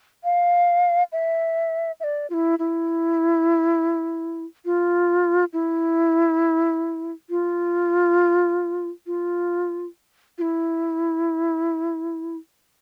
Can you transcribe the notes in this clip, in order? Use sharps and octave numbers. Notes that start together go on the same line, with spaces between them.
F5
E5
E5
D5
F4
E4
E4
F4
E4
F4
F4
F4
E4